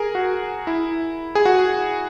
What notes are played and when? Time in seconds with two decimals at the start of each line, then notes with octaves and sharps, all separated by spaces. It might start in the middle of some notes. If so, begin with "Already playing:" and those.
Already playing: G#4 A#4
0.15 F#4
0.67 E4
1.35 G#4
1.45 F#4